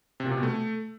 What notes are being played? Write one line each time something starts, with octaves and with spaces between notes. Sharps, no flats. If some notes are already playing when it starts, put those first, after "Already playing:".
C3
A#2
C3
B2
A3